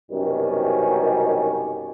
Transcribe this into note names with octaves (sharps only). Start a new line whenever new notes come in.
C2 F#2 B2 D#3 G3 C#4